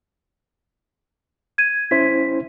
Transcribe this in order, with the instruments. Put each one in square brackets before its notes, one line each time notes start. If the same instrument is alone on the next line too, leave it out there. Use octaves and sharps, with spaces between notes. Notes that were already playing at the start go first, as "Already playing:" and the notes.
[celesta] G#6 D#7
[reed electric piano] C#4 E4 C5 [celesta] B6